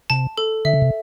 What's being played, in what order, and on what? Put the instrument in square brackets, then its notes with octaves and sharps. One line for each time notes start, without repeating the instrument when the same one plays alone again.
[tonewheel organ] C3 [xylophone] A5
[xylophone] A4
[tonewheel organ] D3 [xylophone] E5
[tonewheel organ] C#3
C3